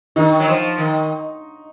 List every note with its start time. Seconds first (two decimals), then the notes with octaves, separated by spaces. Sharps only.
0.16 D#3 D#4
0.40 F#3
0.48 F3
0.78 D#3